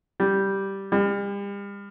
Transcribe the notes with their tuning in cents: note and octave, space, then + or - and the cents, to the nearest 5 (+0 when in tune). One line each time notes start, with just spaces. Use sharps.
G3 -5
G3 +40